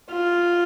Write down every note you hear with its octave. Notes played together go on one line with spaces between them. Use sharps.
F4